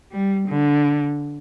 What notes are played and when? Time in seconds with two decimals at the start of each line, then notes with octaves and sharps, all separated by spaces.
0.11 G3
0.49 D3